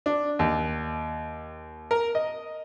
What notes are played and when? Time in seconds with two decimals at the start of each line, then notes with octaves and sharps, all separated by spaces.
0.06 D4
0.39 D#2
1.91 A#4
2.15 D#5